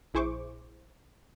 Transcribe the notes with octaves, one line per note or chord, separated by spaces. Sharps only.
A#1 E4 G#4 C5 C#6 D6